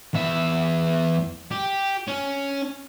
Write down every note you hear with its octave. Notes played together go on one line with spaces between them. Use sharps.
E2 E5
G4
C#4